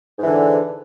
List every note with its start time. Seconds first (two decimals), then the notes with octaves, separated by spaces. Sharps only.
0.18 G#2
0.22 E3
0.27 D3